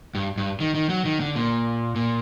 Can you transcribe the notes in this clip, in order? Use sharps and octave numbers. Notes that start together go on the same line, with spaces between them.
G2
G2
D#3
D#3
F#3
D#3
D3
A#2
A#2